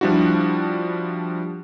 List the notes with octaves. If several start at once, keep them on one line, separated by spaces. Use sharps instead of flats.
F3 G3 D4 E4 F#4